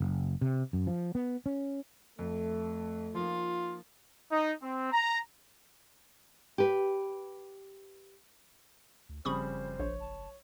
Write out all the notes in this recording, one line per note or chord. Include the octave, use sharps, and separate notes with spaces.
F#1
C3
F#2
F3
B3
C#4
F2 A3
F3 A#3 D#4 F4
D#4
C4
A#5
G4 B4
D2
F#1 F2 C#3 G3 C5 B5 C#6 D#6
A#1 C#5
A5